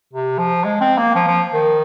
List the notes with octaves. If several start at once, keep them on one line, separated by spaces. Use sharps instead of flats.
C3
F3
G#3
C4
A#3
F3
F3
D#3